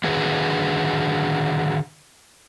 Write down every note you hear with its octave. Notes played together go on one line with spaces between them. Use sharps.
D3 D#3 F#4 G#4 B4